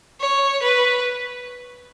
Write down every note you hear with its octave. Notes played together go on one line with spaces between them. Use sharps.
C#5
B4